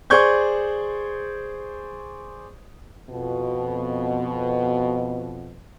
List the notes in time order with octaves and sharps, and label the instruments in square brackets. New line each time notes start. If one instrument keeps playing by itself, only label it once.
[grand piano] G#4 C5 D5 C#6 G6 G#6
[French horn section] F2 B2